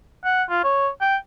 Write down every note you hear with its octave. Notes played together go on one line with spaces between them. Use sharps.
F#5
F4
C#5
G5